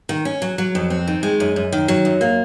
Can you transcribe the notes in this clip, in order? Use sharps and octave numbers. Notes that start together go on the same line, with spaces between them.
D#3
C#4
F#3
F#3
F2
C4
D#3
G#3
F#2
F#2
D#3
F#3
F#2
A#3